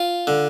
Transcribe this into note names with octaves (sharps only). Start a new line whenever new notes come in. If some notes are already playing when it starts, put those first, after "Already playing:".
Already playing: F4
D3